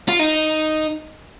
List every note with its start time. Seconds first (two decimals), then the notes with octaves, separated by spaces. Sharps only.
0.09 F4
0.19 D#4